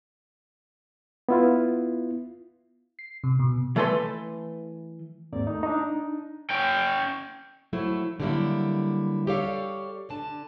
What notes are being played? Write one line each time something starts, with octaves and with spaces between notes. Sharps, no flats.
B3 E4 F4
C7
C3
B2
E3 A3 A4 B4 C6
D#2 G#2 A#3 C4 D5
A3 D#4
D4 D#4
C#4 G5
F3 F#3 A3 E4
D3 F#3 G3 A#3 E4
G4 A4 C#5 D5 F5
D3 D4 A5